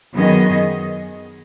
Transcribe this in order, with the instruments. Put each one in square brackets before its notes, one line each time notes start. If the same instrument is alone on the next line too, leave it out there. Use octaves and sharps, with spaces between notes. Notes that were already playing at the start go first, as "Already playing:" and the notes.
[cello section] F#2 D#3 B3 G#4 D#5